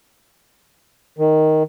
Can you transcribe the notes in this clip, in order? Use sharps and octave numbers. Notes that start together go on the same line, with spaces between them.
D#3